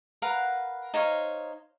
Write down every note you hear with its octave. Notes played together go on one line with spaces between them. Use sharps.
A#4 B4 F5 F#5
D#4 C5 C#5 F5